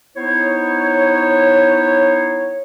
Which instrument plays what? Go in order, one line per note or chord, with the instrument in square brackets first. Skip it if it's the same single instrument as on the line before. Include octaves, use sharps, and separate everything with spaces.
[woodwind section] B3 D#4 E4 C5 C#5